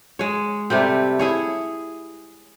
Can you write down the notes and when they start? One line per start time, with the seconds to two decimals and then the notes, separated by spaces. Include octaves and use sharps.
0.19 G#3 C#5
0.70 C3 G3 A3 C4
1.19 E4 G#4 C#5